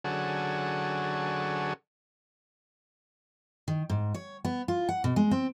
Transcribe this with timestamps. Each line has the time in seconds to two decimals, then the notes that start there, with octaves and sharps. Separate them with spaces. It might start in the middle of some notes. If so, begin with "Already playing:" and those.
0.05 D3 F#3 C#4 F#4 G#4 A4
3.68 D#3
3.90 G#2
4.14 C#5
4.45 B3
4.68 F4
4.89 F#5
5.04 B2
5.16 G#3
5.31 C4